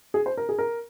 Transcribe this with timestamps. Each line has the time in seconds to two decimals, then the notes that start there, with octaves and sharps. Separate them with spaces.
0.14 G#4
0.26 C5
0.37 A#4
0.49 G#4
0.59 A#4